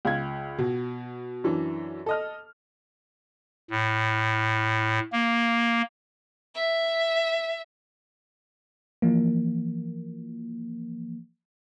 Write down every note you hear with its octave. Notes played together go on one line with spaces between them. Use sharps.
C#2 F5 G#6
B2
F#2 E3 D4
A4 D#5 F6
A2
A#3
E5
E3 F3 A#3